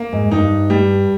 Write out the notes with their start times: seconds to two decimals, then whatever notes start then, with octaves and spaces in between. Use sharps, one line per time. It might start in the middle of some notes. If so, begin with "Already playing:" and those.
Already playing: A#3
0.13 G#2
0.31 G2 D#4
0.70 G3